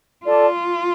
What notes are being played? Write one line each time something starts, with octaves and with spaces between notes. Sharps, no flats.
F4 A4 D5 A5